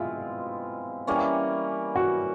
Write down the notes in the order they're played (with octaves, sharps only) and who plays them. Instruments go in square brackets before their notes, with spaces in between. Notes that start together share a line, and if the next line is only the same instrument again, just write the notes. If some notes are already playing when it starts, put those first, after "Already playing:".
Already playing: [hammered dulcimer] B2 G#3 C4 E4 [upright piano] F4
[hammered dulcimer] E3 G3 A#3 C#4
[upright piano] F#4